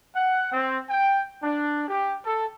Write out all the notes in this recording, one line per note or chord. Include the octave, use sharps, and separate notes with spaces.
F#5
C4
G5
D4
G4
A4